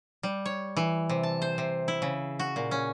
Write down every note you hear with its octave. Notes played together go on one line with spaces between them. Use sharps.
G3
C#5
E3
C3
A5
C5
C3
E4
C#3
F#4
A#2
C#4